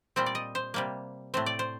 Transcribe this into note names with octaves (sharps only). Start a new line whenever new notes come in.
A#2 G3 C4 C5
D5
D#5
C5
C3 G3 A#3
A2 A3 C4 C5
D5
C5